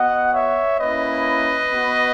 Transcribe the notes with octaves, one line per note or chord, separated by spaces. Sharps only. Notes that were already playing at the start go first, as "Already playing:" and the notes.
Already playing: B3 F#4 D#5 F#5
C#5 E5
A#3 C#4 E4 B4 D#5
B3 F#4